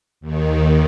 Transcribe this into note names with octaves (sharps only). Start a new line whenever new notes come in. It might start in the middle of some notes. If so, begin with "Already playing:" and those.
D#2 D#3